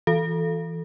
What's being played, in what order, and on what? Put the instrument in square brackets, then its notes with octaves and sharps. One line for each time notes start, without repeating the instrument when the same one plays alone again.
[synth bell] E3 A4